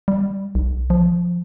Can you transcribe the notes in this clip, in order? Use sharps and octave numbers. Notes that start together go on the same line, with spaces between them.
G3
B1
F3